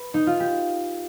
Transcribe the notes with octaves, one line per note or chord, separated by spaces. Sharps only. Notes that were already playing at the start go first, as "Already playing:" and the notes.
Already playing: B4
D#4
F4
G4